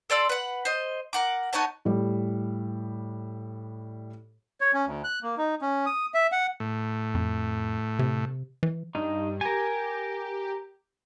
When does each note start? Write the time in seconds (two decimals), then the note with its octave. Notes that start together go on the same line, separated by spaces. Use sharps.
0.10 A4 D5 C6 E6
0.29 B4 F#5
0.65 C5 D#5
1.13 A#4 F#5 D6
1.53 B3 D#4 C#5 A5
1.85 A2 G3
4.61 C#5
4.74 C#4
4.86 D2
5.04 F#6
5.23 A#3
5.38 D#4
5.62 C#4
5.86 D#6
6.14 E5
6.32 F#5
6.60 A2
7.15 F2
7.99 C3
8.63 E3
8.95 G2 D#4
9.41 G4 A#4 G#5